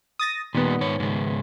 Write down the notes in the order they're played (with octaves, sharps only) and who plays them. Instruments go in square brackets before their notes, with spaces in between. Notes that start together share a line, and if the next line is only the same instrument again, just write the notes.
[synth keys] D#6 A6 A#6
[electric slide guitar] A#2 G3 [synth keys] D#3 B3
[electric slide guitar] G#2 C#5
G#2 C#3 G#3